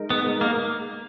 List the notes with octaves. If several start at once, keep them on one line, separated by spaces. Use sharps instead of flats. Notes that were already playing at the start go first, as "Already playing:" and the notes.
Already playing: G#3 D#4 A#4
B3
A#3